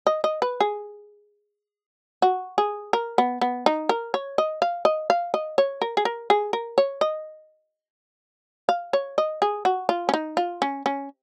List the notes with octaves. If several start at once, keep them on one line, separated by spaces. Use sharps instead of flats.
D#5
D#5
B4
G#4
F#4
G#4
A#4
B3
B3
D#4
A#4
C#5
D#5
F5
D#5
F5
D#5
C#5
A#4
G#4
A#4
G#4
A#4
C#5
D#5
F5
C#5
D#5
G#4
F#4
F4
C#4
D#4
F4
C#4
C#4